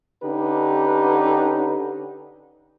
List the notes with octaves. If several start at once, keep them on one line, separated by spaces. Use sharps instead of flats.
D3 C#4 D#4 G4 B4